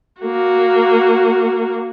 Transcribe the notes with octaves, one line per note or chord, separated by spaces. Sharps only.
A#3 F#4